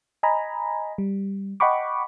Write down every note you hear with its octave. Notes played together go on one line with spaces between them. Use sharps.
D#5 G#5 A#5 B5
G3
D#5 F#5 G5 B5 C#6 D6